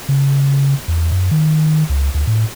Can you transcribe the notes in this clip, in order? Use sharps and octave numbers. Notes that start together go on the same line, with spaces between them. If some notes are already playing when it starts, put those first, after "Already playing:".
C#3
E2
F#2
D#3
C#2
D2
A2